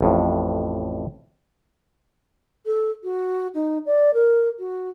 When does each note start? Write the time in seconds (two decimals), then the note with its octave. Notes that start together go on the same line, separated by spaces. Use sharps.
0.01 A1 F2 A2
2.66 A4
3.03 F#4
3.54 D#4
3.86 D5
4.14 A#4
4.59 F#4